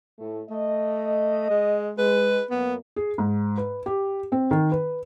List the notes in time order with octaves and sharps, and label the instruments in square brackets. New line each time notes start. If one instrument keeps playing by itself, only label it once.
[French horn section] A2 A3
[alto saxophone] A3 [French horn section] D#5
[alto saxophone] G#3
[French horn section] G#3 [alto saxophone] B4
[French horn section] F#2 A#3 [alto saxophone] B3
[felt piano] G#4
G#2
B4
G4
C4
D#3
B4